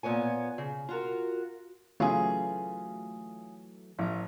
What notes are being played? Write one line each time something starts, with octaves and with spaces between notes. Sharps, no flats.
A#2 B3 C#5 G#5
C#3
F4 F#4 A#4
C#3 E3 F#3 A3 F4 G#4
A1 F3 A#5